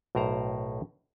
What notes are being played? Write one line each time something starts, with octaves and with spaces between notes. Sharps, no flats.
B1 A2 A#4 C5 A#5